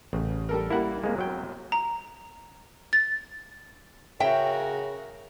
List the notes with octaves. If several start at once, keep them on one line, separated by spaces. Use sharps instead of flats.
A1 C#3
G3 A4 A#4
G3 A#3 E4 F#5
G1 C2 G#3 A#3
F#3 G5
A#5
A6
C#3 F#4 A#4 E5 G5